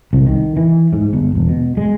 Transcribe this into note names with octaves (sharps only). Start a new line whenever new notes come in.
C2
D#3
E3
G#2
G1
E1
B2
G#3